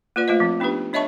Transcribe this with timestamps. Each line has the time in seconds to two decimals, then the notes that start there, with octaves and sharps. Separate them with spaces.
0.16 A#3 F4 B4 D5
0.28 A3 F4 C5 D#5
0.40 F3 C4
0.60 B3 D4 D#4 G4 B4
0.93 D4 C#5 D#5 E5 A5 C#6